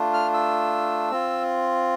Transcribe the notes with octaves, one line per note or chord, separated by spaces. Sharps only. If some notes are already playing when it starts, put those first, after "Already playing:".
Already playing: A3 D4 F4
F6
E6
C4 F4